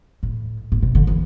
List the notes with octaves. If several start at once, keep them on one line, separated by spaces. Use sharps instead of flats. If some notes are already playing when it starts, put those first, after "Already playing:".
A2
A2
B2
D3
E3